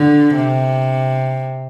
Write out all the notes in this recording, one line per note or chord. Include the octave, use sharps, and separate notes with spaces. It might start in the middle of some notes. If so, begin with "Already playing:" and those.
Already playing: D3
C3